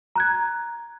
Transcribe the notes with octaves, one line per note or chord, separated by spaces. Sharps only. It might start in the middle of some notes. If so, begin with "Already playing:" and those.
A#5 F#6 G#6